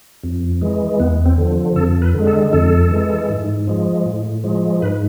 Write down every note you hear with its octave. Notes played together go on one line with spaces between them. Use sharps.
F2
E3 G#3
E2 B3
C4
D3 F3
F2 A4
B4
D3 G#3
A4
F2 A4
E3 G#3
G#2
F3 G#3
A2
F3 G#3
G#2 B4